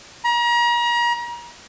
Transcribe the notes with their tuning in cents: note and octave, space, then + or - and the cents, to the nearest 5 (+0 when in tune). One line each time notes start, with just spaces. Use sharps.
A#5 +35